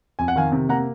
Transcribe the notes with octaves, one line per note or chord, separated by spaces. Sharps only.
F2 G#5
F#5
D#3 F5 G#5
C3
A#3 F#5 A#5